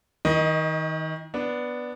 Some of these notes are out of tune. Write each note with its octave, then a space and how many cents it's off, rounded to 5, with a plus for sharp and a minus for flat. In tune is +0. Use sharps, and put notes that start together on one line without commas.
D#3 +30 D#5 +0
B3 +0 D4 +0